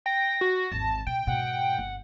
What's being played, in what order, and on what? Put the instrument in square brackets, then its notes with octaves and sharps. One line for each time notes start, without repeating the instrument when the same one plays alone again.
[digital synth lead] G5 [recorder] A#6
[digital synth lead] F#4
[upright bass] G#1 E2 [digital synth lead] A5
[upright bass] B2 [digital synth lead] G5
[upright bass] G#2 B2 [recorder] F#5
[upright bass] G1